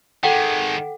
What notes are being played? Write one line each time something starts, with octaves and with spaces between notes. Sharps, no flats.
D#3 G#3 A4 F#5 G5